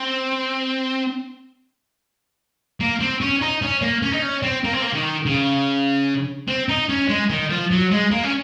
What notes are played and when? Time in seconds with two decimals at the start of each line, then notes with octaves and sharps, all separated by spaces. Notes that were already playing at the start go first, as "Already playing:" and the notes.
Already playing: C4
2.80 A#3
3.00 C4
3.21 C#4
3.41 D#4
3.62 C#4
3.82 A#3
4.02 C#4
4.13 D#4
4.22 C#4
4.43 C4
4.64 A#3
4.73 C4
4.82 A#3
4.94 D#3
5.26 C#3
6.48 C4
6.69 D#4
6.89 C#4
7.09 G#3
7.30 D#3
7.50 F3
7.71 F#3
7.91 G#3
8.11 A#3
8.24 C#4